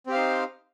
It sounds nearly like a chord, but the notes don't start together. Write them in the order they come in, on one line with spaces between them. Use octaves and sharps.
C4 G4 F5 C5 D#4